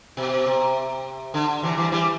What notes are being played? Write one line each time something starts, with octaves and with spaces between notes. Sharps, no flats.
B2
C3
D3
C3 E3
E3 G3
E3 G3